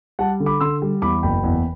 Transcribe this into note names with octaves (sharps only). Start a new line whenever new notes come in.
G3 F#5 A5
D3
B5 D6
D3 C6 E6
G3
E2 B5 D6
F#1 G5 B5
E2